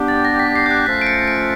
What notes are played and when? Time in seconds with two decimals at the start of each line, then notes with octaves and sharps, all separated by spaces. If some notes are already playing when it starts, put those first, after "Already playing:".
Already playing: G3 B3 D4 G4
0.08 A6
0.25 A#6
0.39 B6
0.56 C7
0.66 G6
0.71 F#6
0.86 F3 A3 C#4 F4 A4 B6
1.01 D7
1.07 C#7
1.27 D7